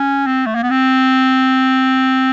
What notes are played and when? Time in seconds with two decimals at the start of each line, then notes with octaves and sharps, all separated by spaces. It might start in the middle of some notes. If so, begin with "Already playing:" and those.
Already playing: C#4
0.26 C4
0.46 A3
0.55 A#3
0.63 B3
0.70 C4